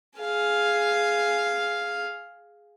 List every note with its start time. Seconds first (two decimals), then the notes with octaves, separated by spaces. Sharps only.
0.19 G#4 F5